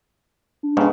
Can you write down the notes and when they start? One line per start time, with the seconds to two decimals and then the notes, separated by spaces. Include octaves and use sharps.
0.63 D4
0.77 F2 G#2 C#3 G#3 B3 C#4